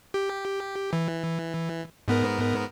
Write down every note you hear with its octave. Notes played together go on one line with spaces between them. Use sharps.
G4
E3
G#2 B3 A#4